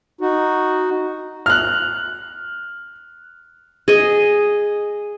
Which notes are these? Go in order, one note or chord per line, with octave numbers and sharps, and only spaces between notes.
D#4 F#4
F6 F#6
G#4 D#5